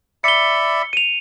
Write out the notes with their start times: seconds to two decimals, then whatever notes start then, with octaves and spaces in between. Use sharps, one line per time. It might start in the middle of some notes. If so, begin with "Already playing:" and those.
0.24 D5 E5 B5 C#7 G7
0.93 D#7 F7